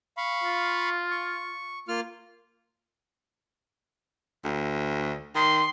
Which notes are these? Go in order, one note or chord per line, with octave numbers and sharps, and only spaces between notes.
F5 B5 C#6
F4
C#6
A#3 F4 F6
D2
D#3 C6